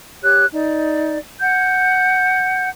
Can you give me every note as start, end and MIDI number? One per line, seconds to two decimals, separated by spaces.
0.22 0.45 67
0.22 0.45 73
0.22 0.45 90
0.53 1.17 63
0.53 1.17 74
1.40 2.69 78
1.40 2.69 91